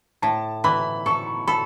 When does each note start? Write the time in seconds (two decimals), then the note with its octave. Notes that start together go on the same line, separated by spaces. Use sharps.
0.22 A2 A5
0.64 E3 B5
1.06 A4 C#6
1.47 A4 B5